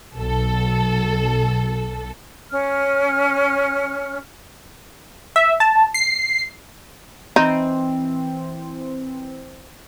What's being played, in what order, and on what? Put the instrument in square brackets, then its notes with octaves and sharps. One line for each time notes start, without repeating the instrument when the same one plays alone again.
[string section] B1 A4
[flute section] C#4 F6
[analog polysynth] E5
A5
C7
[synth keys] E3 C4 [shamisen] D#4